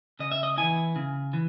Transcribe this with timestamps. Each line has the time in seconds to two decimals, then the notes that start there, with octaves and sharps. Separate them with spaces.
0.19 C#3 D#5
0.32 E5
0.43 D#5
0.58 E3 B3 E4 G#5
0.96 C#3
1.33 E3